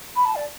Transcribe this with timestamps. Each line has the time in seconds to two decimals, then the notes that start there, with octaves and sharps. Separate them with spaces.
0.16 B5
0.25 A5
0.36 D5